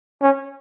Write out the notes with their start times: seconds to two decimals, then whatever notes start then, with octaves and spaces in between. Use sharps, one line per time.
0.22 C#4